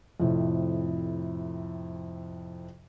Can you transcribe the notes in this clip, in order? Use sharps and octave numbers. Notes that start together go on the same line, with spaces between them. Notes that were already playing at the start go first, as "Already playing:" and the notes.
F2 A2 C3